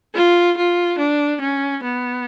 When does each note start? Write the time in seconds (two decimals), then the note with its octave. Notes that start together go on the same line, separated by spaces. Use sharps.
0.15 F4
0.57 F4
0.98 D4
1.41 C#4
1.83 B3